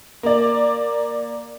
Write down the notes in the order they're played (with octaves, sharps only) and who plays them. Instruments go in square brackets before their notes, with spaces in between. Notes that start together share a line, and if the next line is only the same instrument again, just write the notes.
[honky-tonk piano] A#3 D5